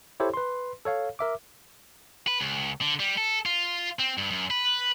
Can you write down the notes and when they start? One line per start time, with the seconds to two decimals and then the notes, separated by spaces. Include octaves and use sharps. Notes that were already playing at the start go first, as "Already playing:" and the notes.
0.20 E4 G4 A4 C5 C#5
0.34 B4 C6
0.85 A4 C#5 F5
1.19 A#4 E5 D6
2.28 B4
2.40 C#2
2.81 D3
3.00 G3
3.17 A4
3.46 F4
3.99 C4
4.18 G2
4.31 F#2
4.50 B4